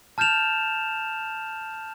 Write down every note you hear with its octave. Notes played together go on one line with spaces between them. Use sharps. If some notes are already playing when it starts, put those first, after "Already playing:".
A5 F6 G6 A6 E7 F7